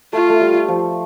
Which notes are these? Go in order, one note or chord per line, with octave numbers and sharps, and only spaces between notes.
A3 F4
A3
G3
F3